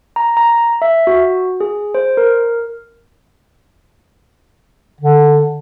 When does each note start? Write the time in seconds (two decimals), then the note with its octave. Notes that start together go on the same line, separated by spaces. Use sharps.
0.16 A#5
0.37 A#5
0.82 E5
1.07 F#4
1.60 G#4
1.95 C5
2.17 A#4
5.01 D3